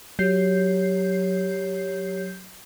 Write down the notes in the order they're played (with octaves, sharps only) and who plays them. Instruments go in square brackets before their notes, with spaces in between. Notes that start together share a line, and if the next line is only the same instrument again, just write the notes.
[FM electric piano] F#3 G6 C7 [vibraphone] G4 C#5